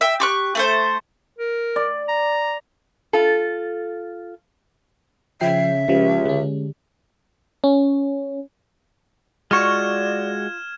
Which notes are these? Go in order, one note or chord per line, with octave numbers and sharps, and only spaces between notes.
E5 G5
G4 C#6 F#6
A3 A4 C5
A#4
D5
A#5
F4 A4
C#3 F3 E5 G5 C7
C#2 C#3 F3 G4
D3 G#3 C#4
C#4
G#3 F4 F#4 D5 C#6 F6 G#6 E7